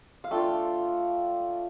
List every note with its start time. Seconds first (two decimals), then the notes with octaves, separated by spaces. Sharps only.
0.24 F5
0.31 A3 D4 F4 G5